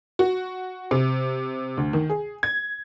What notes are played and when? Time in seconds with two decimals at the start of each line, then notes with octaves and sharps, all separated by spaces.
0.19 F#4
0.91 C3
1.77 D2
1.93 D#3
2.10 G#4
2.43 G#6